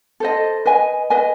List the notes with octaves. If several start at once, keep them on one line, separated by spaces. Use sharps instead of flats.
A4 C5 D#5
B4 D#5 G#5
B4 D#5 G#5